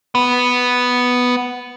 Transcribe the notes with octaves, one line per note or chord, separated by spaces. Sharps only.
B3